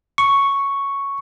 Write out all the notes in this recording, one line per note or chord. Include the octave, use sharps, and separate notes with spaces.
C#6